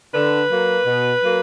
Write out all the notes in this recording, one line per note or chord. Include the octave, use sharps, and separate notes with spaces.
D3 B4
F#3 A#3
B2
F#3 A#3